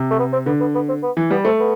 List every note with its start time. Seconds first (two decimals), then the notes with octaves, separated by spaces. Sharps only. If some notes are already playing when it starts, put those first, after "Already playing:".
Already playing: C3
0.11 A3
0.19 B3
0.33 C4
0.46 D3 B3
0.60 B3
0.75 B3
0.89 C4
1.02 B3
1.17 E3
1.31 G3 B3
1.45 A3 C4
1.59 B3